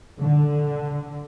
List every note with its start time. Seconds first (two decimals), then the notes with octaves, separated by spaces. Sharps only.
0.20 D3